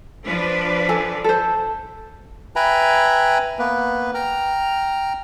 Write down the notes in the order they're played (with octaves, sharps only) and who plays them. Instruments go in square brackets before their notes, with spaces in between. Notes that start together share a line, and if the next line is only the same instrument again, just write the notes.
[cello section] F3 D4 B4
[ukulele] A4 G#5
A4 C5
[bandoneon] B4 E5 G5 G#5 A#5 B5
A#3 B3 B4
G5 A#5 F6